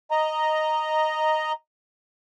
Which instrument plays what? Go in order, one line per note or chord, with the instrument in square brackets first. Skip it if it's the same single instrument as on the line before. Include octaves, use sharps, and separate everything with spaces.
[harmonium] D#5 A#5